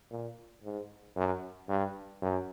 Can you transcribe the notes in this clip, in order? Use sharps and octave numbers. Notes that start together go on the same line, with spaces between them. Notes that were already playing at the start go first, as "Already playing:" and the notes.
A#2
G#2
F#2
G2
F#2